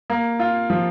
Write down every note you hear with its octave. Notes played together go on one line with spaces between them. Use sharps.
A#3
F4
F3